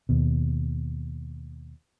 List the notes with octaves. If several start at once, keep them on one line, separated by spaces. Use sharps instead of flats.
D#2 B2